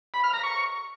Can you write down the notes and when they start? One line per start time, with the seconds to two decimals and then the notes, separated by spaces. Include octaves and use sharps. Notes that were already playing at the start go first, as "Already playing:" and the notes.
0.14 B5
0.24 F6
0.34 A#5
0.43 C#6